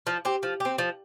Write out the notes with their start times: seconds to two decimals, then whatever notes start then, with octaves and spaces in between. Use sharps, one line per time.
0.07 F3
0.25 C4 G4
0.43 F3
0.60 C4 G4
0.78 F3